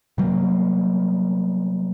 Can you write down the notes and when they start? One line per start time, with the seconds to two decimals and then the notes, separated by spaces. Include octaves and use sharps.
0.18 C3 F#3 G3 A#3